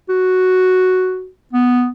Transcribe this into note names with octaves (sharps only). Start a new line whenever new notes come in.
F#4
B3